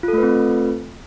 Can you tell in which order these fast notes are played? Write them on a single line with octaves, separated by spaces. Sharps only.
F4 A4 A3 B4 C4